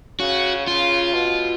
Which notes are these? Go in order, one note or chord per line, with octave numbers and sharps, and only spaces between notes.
C#3 F#4
C#3 F4
B2